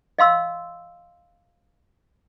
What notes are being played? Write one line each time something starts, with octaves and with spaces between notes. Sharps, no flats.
D#5 F5 C6 E6